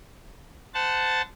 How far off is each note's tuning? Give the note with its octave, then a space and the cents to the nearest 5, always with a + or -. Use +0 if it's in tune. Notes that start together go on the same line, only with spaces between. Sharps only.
C5 -25 F#5 +0 A5 +0